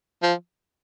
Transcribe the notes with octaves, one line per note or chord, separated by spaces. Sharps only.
F3